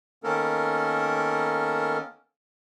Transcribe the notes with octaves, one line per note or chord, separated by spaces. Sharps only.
D#3 A#3 B3 C#4 A4 A#4